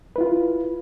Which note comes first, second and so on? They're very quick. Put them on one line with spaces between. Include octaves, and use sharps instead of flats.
B4 E4 F4